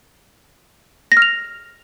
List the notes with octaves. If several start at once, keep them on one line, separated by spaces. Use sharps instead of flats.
A#6
F6
F7